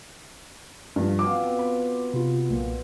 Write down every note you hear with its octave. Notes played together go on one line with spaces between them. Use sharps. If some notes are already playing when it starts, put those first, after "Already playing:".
G2 F3
B2 C4 F4 D6
B5
C3 F4
B1 A#2